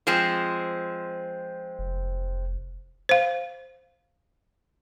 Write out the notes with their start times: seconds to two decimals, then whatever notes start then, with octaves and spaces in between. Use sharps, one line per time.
0.07 F3 G#3 C4
1.79 F1
3.09 C5 F5